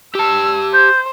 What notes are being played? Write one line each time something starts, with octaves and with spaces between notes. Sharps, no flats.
G4 A5 E6
C5 G6